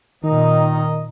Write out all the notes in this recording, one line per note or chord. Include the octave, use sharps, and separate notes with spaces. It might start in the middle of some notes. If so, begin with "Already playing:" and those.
A#2 D#3 D#4 D#5